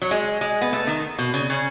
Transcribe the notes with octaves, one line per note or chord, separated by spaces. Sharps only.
F#3
G#3
G#3
B3
A3
D#3
B2
C#3
C#3